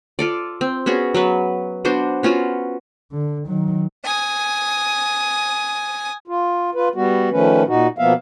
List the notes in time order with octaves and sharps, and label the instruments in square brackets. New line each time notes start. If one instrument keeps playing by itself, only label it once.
[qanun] F4 A4 D5
C4
B3 C#4 F#4 G#4
F#3 B3 B4
B3 D4 F#4 C5
B3 C#4 F4 F#4
[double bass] D3
D#3 F#3
[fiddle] G#5 D#6
[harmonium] F4
F4 B4
G3 B3 F#4
D#3 F3 A3 C#4 B4
A#2 D#4 F#4
B2 F3 A#3 B3 E5 F5